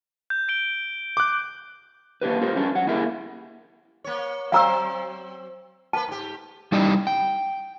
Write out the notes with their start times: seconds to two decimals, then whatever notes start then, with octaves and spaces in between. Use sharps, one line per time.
0.30 G6
0.48 G6 D7 G7
1.17 D6 F#6
2.21 A#3 D4 G4 B4
2.42 F4 G4 A#4 C5
2.55 F#3 C#4 D4 F4 F#4
2.75 F#3 F#5
2.87 A#3 E4 G4 G#4 A#4 E5
4.04 A#3 C#5
4.52 F#3 C4 C5 F5 A#5 E6
5.93 A#3 B4 A5
6.08 G#2 G4
6.72 G3 D#4 E4 G4 D#5 G5
7.07 G5